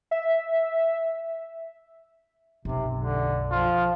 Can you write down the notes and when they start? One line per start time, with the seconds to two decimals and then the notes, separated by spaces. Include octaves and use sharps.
0.11 E5
2.65 B1 F#2 C3
3.00 D3
3.51 F3 F4